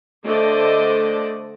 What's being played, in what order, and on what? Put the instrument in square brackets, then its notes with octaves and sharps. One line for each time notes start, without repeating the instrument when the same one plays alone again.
[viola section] D3 A3 C5 D5 D#5